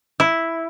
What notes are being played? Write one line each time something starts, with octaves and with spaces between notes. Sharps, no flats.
E4